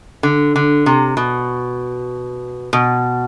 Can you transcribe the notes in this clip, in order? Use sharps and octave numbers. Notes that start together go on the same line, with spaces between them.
D3
D3
C3
B2
B2